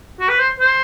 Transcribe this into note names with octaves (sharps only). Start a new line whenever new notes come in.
F#4
B4
C5
C5